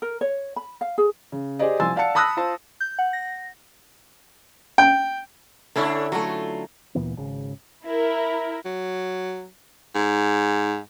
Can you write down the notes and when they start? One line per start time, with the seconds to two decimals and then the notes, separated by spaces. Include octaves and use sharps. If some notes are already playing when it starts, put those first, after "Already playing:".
0.02 A#4
0.21 C#5
0.56 B5
0.81 F5
0.98 G#4
1.32 C#3
1.59 G4 G#4 C5 D5 D#5
1.80 C2 F3 G#5 C6 E6 A6
1.96 D5 F5 F#5 A5 C#7
2.15 A5 B5 D#6 E6 F#6 A#6
2.37 F4 C5 A5
2.80 G6
2.99 F#5
3.13 A#6
4.78 G5
5.76 D3 A3 C#4 D4 E4 C#5
6.12 F#3 A3 F4 F#4
6.95 D2 A#2 E3 B3
7.17 G#1 C#3
7.85 E4 A#4
8.65 F#3
9.95 G#2